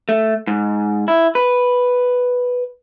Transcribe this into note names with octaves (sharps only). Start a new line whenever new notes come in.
A3
G#2
E4
B4